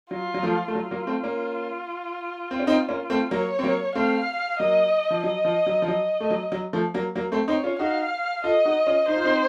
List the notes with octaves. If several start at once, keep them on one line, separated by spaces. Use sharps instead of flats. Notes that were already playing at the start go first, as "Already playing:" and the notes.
F#3 F4
F#3
F3 A3
A3
F#3 F4
F#3 A#3
A3 C4
A#3 C#4
C4
C#4
C4 D#4
A#3 C#4
A3 C4
F#3 A#3 C#5
C4
F#3 A#3
A3 C4 F5
F#3 A#3 D#5
F3
F#3 D#5
F3
F#3
F3
F#3 D#5
A3
F#3
F#3
F3 A3
F#3 A#3
F#3 A#3
A3 C4
C4 D#4 C#5
C#4 F4
D#4 F#4 F5
F4 A4 D#5
D#4 F#4
C#4 F4
D#4 C5
F4
C4 D#4